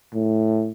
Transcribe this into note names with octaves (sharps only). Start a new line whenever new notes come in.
A2